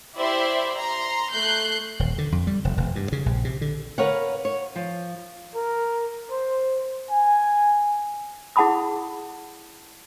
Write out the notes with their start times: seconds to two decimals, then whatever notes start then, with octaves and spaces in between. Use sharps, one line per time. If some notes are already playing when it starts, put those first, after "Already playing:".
0.17 E4 G4 C5 D5 E5
0.76 A#5 C6
1.33 A3 F#6 G6 C7
1.99 D#1
2.18 D3
2.32 F2
2.47 G3
2.65 F1
2.77 E1
2.96 G2
3.12 C#3
3.26 A#1
3.45 C3
3.61 D3
3.98 A#4 B4 C#5 F5 F#5
4.45 C#5
4.76 F3
5.55 A#4
6.30 C5
7.11 G#5
8.56 E4 G#4 F#5 A5 B5 D#6